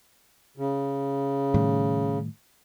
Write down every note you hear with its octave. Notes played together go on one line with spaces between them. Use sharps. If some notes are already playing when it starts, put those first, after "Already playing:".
C#3
A2 D#3 G3